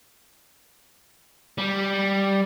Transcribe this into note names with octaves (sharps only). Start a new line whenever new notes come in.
G3